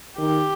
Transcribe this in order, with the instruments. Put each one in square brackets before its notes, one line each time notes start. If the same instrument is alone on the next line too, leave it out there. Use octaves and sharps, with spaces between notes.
[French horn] D#3 [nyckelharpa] G4